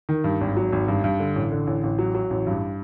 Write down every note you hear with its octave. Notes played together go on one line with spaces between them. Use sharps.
D#3
G2
G#1
F#3
G#1
G2
G2
D3
A1
D3
A1
A1
F#3
F#3
A1
G2